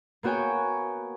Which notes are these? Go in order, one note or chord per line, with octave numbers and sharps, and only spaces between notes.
A#3 B3 F#4 C#5 G5 G#5